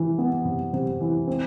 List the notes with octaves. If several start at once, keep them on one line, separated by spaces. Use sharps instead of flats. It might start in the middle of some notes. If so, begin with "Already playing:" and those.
Already playing: C3 E3
B3
C3
C3
E3
C4